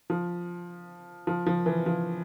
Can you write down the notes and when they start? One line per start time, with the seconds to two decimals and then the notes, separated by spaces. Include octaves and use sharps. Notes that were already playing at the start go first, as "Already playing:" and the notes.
0.10 F3
1.27 F3
1.47 F3
1.66 E3
1.86 F3